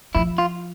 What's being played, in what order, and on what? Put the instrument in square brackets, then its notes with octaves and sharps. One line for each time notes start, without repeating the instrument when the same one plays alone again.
[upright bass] F3 [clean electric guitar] E4
[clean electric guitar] F4